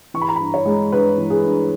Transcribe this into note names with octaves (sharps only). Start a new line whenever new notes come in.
E3 C#6
B5
A#5
G2 B5
C#5
G#3
G2 B4
E3
G#4
G2